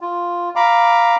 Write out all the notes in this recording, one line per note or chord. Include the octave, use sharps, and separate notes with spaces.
F4
F5 A#5 B5 D6